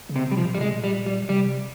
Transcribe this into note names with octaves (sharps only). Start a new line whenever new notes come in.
C#3
C3
C3
G3
F3
A#2
G3
C3 G#3
A#2
G3
G3
C3 G3